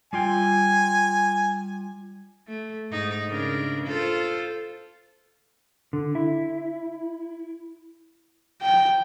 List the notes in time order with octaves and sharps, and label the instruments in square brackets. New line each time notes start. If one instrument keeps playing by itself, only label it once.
[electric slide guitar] G3 F4 G5 [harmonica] G#5
[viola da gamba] A3
G#2 D#4
C#3 D4 A#4
F4 A4 C5
[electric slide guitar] D3
E4
[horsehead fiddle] G5